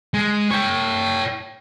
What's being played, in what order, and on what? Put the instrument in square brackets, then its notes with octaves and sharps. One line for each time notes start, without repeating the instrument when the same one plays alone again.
[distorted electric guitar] G#3
C#5 G5